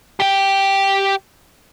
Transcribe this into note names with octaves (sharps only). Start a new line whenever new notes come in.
G4 G5